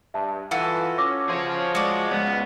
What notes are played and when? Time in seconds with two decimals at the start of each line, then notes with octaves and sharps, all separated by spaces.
0.14 G2 E5 A5
0.51 E3 F4 F#4 A4 F5
0.98 C#4 D6 E6 A#6
1.29 F3 G#4 C#5 C6 G#6 A#6
1.75 G#3 F#4 D5
2.11 C#2 B3 C#5